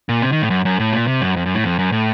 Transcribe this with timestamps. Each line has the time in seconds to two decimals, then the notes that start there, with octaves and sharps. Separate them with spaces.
0.09 A#2
0.22 C3
0.32 D#3
0.42 A2
0.50 F#2
0.65 F#2
0.79 A2
0.93 A#2
1.07 C3
1.21 F#2
1.36 F2
1.46 F#2
1.54 A2
1.64 F2
1.79 F#2
1.92 A2